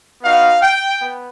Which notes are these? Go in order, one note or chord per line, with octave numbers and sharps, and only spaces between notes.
B3 D#4 F#4 F5
G5
B3